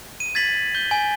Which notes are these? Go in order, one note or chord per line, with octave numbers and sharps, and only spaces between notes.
D#7
G#6 A6 B6 F#7
G6 G7
G#5